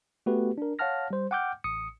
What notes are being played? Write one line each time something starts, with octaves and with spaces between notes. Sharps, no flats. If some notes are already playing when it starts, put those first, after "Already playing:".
A3 B3 F#4 G4 A4 B4
D4 A#4
C#5 F5 F#5 A5 F6 A#6
G3 C5
F#5 G5 D6 F6 G6
A1 D#6 C#7